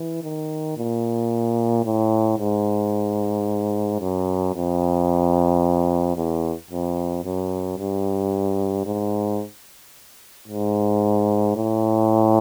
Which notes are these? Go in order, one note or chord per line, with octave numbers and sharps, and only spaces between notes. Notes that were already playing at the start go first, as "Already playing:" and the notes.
Already playing: E3
D#3
A#2
A2
G#2
F#2
F2
E2
F2
F#2
G2
G#2
G#2
A2